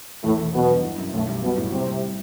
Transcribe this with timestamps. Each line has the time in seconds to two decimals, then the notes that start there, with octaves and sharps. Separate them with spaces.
0.24 E2 A2 A3
0.39 E1
0.54 B2 F#3 B3
0.68 G2
0.84 E3
0.98 F#2
1.13 B1 A2 A3
1.28 G3
1.43 B2 F#3 B3
1.58 A2
1.72 C3 G3 C4
1.87 G3